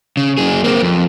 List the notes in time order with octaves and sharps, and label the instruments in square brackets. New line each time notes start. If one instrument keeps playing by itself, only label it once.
[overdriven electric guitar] C#3
F#2 G#4
A#3 C4
F2